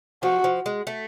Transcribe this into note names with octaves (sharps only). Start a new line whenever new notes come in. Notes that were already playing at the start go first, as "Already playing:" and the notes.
F3 F#4
F3
G#3
A3